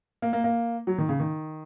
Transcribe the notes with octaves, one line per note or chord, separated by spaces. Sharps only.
A#3
A#3
A#3
F#3
D#3
C#3
D#3